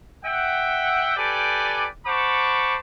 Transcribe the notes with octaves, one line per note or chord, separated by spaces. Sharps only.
E5 F#5 G5
G4 A4 B4 D5 G5 G#5
C5 F#5 A5 B5 C#6 D6